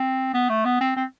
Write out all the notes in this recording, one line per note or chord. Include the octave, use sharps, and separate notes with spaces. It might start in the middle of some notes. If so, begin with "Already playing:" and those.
Already playing: C4
B3
A3
B3
C4
C4